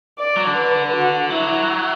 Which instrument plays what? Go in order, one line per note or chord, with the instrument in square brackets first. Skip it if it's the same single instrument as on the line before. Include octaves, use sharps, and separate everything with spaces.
[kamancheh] D5
[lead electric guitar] F#3
D3
[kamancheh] B4
F#4
[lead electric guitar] F#3 [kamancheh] E4